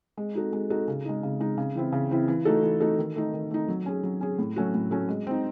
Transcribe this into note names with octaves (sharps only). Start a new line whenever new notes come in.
G#3
D#4 F#4 A4
G#3
D#4 F#4 A4
C#3
G#3 D#4
C#3
G#3 D#4
C#3
E3 C4 E4
C#3
E3 C4 E4
E3
A3 D#4 F#4 A4
E3
A3 D#4 F#4 A4
D#3
A3 D#4
D#3
A3 D#4
F#3
C#4 G#4
F#3
C#4 G#4
A2
F#3 A3 C#4 F#4
A2
F#3 A3 C#4 F#4
G#3
C4 D#4